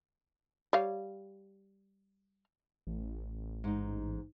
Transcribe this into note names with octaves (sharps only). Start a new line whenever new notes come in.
G3 C#5 F5
A1
G#2 D#4